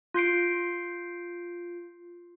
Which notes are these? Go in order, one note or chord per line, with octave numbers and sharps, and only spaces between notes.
F4 G6 C7 D7